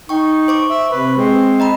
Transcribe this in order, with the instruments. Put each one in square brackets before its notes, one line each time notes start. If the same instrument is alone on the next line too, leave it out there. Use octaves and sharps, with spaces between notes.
[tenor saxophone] D#4 [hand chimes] G5 C#6
[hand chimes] C5 C#6 D6
[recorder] E5
[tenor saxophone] C3 [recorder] B4
[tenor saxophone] G#3 [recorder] C4
[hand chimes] D#5 A#5 B5